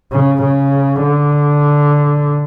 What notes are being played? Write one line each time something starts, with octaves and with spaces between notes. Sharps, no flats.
C#3
C#3
D3